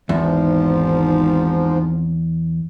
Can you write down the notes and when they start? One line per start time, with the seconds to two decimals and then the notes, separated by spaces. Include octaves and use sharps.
0.09 G#1 E2 G#2 F3